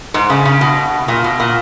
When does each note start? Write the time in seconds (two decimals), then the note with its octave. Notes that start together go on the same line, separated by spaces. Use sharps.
0.14 G#2
0.30 C#3
0.45 C#3
0.61 B2
1.08 A#2
1.24 B2
1.40 A#2